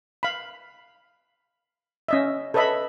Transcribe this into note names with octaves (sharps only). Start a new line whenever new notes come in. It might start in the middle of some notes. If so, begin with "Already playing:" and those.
F5 B5
C#4 D#5 E5
A4 B4 C#5 D#5 E5 B5